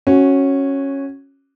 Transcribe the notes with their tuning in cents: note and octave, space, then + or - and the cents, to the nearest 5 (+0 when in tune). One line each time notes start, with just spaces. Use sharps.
C#4 -10 F#4 +0